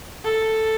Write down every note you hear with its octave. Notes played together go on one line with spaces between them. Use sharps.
A4